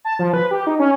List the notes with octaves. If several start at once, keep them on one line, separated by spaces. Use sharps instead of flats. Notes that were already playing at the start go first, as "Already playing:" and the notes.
A5
F3
B4
G4
D#4
C#4